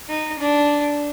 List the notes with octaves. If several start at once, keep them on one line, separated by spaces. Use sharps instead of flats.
D#4
D4